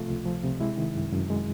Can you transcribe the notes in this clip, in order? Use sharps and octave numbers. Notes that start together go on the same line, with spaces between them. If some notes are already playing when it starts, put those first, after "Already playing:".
Already playing: C3 F3 A3 F4
C#2
F3
C3
G#3 E4
D#3
F#2
F#2
G#3